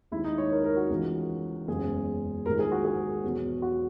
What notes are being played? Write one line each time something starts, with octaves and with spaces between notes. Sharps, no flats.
D#2 D#3 G#3 E4
D#4
C#5
A#4
A#4
F#4
C#2 C#3 E3 G#3
F#1 E2 C#3 G#3 G#4
A#1 G#2 D#3 G#3 A#4
G#4
F#4
G#4
E2 B2 F#3
F#4